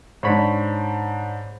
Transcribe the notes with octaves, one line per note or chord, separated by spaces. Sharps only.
G#2 D4 C5 C#5 B5